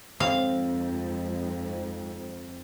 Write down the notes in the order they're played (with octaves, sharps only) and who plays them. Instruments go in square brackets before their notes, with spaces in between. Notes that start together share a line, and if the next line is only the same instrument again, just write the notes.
[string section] F2 G#2 [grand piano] C4 [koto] F5